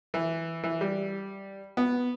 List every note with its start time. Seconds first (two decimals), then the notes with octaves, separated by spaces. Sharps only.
0.14 E3
0.63 E3
0.81 G3
1.77 B3